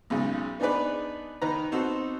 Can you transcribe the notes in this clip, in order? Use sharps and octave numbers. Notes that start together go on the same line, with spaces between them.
B1 G#2 C#3
B3 D4 D#4 G#4 B4 D5
D#3 D#4 B4 A#5
B3 C4 D#4 F#4 A4